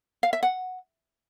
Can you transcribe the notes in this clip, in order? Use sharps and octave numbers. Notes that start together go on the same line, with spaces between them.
F5
E5
F#5